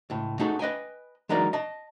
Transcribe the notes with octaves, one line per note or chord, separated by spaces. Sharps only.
C#2 A2
A3 D#4 F#4 G#4 A4
B4 D#5 G5 G#5
E3 F#3 G#3 D#4 A#4 D5
D#5 A5